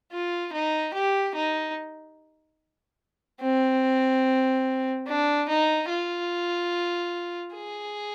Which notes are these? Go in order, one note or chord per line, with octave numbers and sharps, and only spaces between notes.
F4
D#4
G4
D#4
C4
D4
D#4
F4
G#4